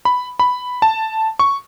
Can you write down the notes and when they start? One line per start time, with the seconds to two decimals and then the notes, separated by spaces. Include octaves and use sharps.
0.05 B5
0.40 B5
0.82 A5
1.39 C#6